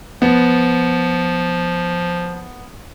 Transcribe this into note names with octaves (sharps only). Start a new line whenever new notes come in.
F3 B3